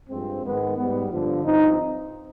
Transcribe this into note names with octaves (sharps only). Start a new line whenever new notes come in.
G2 F3 G#3 C4
G#2 D#3 G#3 B3
G#2 G3 B3
G2 D3 F3
G2 F3 C4 D#4